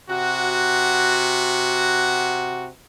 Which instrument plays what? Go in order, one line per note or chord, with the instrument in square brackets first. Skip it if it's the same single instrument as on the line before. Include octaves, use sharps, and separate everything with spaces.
[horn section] C3 F#4